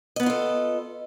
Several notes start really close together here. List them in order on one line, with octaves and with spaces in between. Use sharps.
D#5 B3 A#4 F4 A4